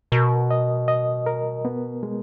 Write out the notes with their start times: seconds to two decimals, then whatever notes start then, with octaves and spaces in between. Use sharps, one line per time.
0.12 B2 A#4
0.51 D#5
0.88 D#5
1.26 A#4
1.65 B3
2.03 G#3